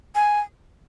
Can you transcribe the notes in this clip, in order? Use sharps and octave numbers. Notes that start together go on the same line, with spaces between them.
G#5